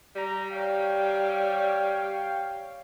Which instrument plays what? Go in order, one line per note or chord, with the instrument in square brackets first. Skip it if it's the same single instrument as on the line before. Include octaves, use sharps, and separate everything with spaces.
[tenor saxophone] G3 [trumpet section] A#5
[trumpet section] C#5 F5 G5